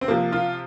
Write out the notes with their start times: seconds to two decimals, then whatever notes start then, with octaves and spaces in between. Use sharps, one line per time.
0.01 C4
0.08 C3 F3 A#3
0.32 F4